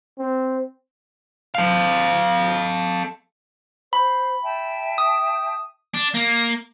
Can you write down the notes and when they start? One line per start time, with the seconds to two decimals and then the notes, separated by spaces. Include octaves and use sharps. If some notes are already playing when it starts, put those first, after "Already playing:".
0.19 C4
1.55 A4 F5
3.93 C5 B5
4.43 E5 G5 A5
4.98 D#6
5.94 D4
6.14 A#3